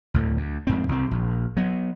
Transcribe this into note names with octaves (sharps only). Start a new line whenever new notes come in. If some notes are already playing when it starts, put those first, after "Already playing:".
D2 A2 D3
D2
F2 G#2 C4
C2 C4
A#1
F#3 B3